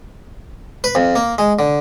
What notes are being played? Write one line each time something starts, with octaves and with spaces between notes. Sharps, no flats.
B4
F2
A#3
G#3
D3